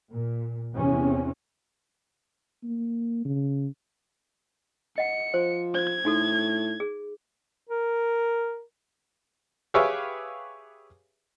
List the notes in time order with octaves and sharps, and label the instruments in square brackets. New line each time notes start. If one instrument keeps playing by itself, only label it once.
[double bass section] A#2
E2 C3 C4 C#4
[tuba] A#3
C#3
[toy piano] D#5 F#5 [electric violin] C#7
[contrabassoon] F3 [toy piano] C5
[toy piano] C5 [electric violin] G#6
[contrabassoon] A2 [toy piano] D#4 F#4 A4
[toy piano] G#4
[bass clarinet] A#4
[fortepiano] G4 G#4 B4 C#5 E5 F5